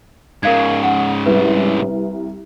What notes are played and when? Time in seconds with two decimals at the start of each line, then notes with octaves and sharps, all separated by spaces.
0.43 G#2 C#3 A#4 F5 G#6
0.84 F#5
1.26 C2 B4